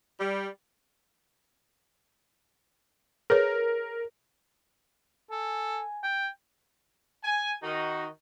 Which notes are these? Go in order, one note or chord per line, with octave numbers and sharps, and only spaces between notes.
G3
G#4 A#4 B4 C#5
A4 G#5
G5
G#5
D#3 D#4 F#4